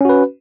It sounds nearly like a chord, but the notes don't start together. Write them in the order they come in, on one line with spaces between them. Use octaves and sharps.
C#4 F#4 B4